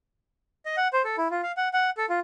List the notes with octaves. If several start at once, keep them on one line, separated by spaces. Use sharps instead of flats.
D#5
F#5
C5
A4
E4
F4
F5
F#5
F#5
A4
F4